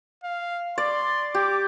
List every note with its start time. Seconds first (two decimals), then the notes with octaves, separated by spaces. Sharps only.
0.24 F5
0.78 D5 C6
1.35 G4 D6